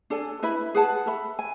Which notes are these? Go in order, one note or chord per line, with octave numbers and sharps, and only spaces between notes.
D4 A4 D5 G#5
E4 B4 E5 B5
G#4 B4 F#5 A5
A4 E5 B5
G#5